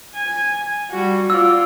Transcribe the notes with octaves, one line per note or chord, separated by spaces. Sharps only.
G#5
G3 F#4
F4 D5 E6